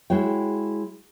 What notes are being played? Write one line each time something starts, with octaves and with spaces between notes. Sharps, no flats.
G#3 E4 F#4 C#5 G5